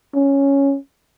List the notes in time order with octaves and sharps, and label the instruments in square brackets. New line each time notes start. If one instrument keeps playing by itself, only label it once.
[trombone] C#4